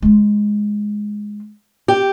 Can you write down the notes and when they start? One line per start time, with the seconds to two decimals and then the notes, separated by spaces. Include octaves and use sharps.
0.02 G#3 F4
1.88 G4